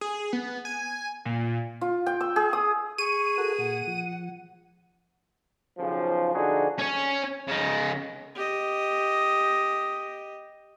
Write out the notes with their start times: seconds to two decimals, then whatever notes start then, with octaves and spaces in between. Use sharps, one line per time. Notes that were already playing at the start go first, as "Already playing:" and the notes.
0.01 G#4
0.33 B3
0.65 G#5
1.25 A#2
1.81 F4
2.06 G5
2.21 E6
2.36 G#4
2.53 D#6
2.98 G#4 C#6 D#7
3.38 F#4 A4 A#4 F#5
3.59 A#2 F#5
3.87 F3
5.78 B1 C#3 F3
6.34 D3 F3 D4 D#4 F#4 G#4
6.79 C#4 C#5
7.47 C#3 D#4
8.35 G4 D#5